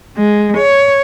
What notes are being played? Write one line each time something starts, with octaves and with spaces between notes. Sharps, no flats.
G#3
C#5